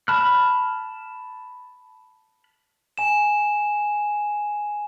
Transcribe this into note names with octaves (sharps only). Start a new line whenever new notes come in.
A5 B5 F6 F#6
G#5 E7